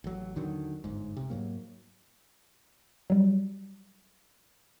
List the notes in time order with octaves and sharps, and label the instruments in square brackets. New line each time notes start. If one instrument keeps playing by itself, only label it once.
[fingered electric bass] A1 F#3
D#2 D3 D#3 F#3
G1 G#2
C3
G#2 F#3 A#3
[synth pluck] F#3 G3